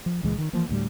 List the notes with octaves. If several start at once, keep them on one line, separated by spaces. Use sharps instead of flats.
F3
C#2 A#2 E3 G#3
D#3
E3 F3 A#3
D2 A2 G3